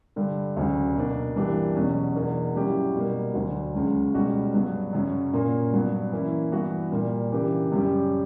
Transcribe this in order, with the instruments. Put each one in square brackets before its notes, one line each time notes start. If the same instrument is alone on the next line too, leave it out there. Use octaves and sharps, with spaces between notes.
[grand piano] G2 D3 G3
D2 C#3 F#3
B2 A#3 D4
G2 E3 A#3 D4 G4
E2 B2 F#3 C#4
E2 B2 A#3 D4
G2 F#3 C#4 E4 G4
B2 G3 A#3
D2 D3 F#3
C#2 C#3 F#3 C#4
C#2 B2 G3 C#4 F#4
G2 F#3 B3
F#2 C#3 F#3 C#4
A#2 A#3 C#4
G2 F#3 B3
E3 A#3 C#4 E4
G2 E3 B3 F#4
A#2 G3 A#3
C#3 E3 A#3 D4 G4
F#2 C#3 G3 C#4 G4